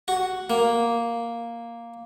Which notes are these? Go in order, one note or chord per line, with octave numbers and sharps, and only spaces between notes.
F#4
A#3